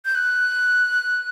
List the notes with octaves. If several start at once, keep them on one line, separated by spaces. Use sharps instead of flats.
G6
F#6